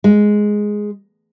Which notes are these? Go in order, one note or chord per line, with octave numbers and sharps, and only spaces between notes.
G#3